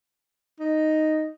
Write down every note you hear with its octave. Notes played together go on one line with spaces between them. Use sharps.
D#4